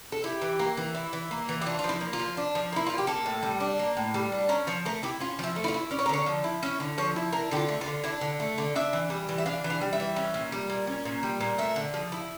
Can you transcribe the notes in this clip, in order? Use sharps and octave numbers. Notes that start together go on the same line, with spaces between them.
A4
E4 G4
E3
A#3
E3
E4
E3
A#3
E3
G4
D4 F4
F4
F3
E4
A#3
F4
F3
D4
F3
A#3 E4
F3 F4
G4
A#3 A4
A2
G3
D4
A#3
A2
G3
D4
C#4 A#4
F3 C#5
A3 A#4
E4 G4
C#4 F4
F3 E4
A3
E4
F4
E4
C#4 D5
C#5
A#4
D3 C#5
F3
E4
C#4 E5
D3
F3 C#5
E4
D4 A#4
D3 F4 G4
A3
F4
D3
D4 E4
D3
A3
D3
D4 E5
E3
G3
E3
E5
D4 F5
E3
F5
G3
E5
E3
C#4
A#2
G3
A#2
C#4
A#2
G3
A#2
A3 E5
D3
F3
E4